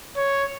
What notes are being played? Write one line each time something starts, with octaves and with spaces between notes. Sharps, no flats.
C#5